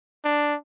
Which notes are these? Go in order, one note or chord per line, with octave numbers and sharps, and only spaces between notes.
D4